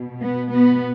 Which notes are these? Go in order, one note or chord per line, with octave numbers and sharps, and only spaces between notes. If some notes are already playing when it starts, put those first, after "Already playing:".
Already playing: B2
B3
B3